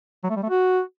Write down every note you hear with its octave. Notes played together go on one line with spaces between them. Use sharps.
F#3
A3
G3
A3
F#4